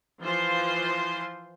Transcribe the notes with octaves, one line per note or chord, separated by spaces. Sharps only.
E3 F3 F4 C5 C6